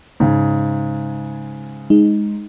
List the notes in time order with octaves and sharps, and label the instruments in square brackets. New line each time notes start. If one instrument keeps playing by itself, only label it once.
[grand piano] G#2 C#3
[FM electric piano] G#3 D#4